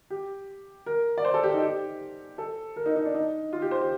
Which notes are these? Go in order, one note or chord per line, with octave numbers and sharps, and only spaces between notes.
G4
A#4
D5
C5
A4
G4
D#4
G4
A4
A#4
D#4
D#4
D4
D#4
F4
G4
C5
G4